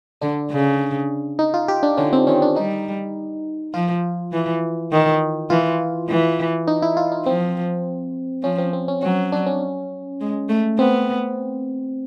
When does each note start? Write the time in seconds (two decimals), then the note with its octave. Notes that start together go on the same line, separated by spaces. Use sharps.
0.22 D3 D4
0.51 C#3
1.39 D#4
1.54 F4
1.68 G4
1.83 D4
1.97 D3 C#4
2.13 C4
2.27 D#3 C#4
2.42 D4
2.56 G3 D#4
3.74 F3 F4
4.32 E3
4.92 D#3
5.50 E3 F4
6.09 E3
6.68 D#4
6.82 E4
6.97 F4
7.12 D#4
7.26 F3 C4
8.43 F3 C#4
8.58 C4
8.73 C4
8.88 C#4
9.03 F#3 C#4
9.32 D4
9.46 C#4
10.21 G#3
10.49 A3
10.78 B3 C4